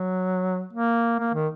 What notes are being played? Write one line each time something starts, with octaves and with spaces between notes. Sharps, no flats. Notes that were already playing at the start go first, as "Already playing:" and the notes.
Already playing: F#3
A#3
A#3
D#3